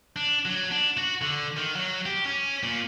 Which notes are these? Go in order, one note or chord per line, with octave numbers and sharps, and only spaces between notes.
D4
F#3
D4
F#4
D3
D#3
F#3
G4
C#4
A#2